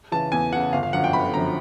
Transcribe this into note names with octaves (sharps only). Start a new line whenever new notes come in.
C#3 E3 A5
E2 G#5
C#3 E3 F#5
G1 F5
F5
F#2 D3 F3 F#5
G5
G1 B5
F#2 D3 F3 A#5